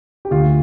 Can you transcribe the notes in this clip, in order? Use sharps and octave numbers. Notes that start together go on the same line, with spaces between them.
G4
D2 F4